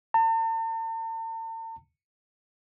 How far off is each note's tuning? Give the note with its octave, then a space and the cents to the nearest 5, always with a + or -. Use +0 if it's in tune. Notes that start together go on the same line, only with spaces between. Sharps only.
A5 +45